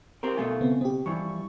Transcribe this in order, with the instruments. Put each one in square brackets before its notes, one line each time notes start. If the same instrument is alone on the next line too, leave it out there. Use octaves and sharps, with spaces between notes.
[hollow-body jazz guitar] C4 G4 A#4
[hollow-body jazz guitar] B2 A3 F4 [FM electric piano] G#5
[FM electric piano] C#3 B3 C4
[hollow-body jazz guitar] B2 [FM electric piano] C4 G4
[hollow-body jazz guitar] G2 E3 F3 [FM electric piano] C#6